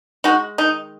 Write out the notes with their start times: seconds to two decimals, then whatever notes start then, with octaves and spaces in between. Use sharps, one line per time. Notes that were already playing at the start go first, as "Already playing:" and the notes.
0.24 G#3 D#4 F#4
0.58 D#3 D#4